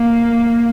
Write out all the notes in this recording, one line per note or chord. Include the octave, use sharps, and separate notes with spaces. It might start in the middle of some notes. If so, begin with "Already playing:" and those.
Already playing: A#3